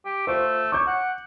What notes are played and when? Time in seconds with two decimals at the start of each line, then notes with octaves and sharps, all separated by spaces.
0.05 G4
0.27 A3 F4 C5
0.72 C#5 D6 G6
0.87 F#5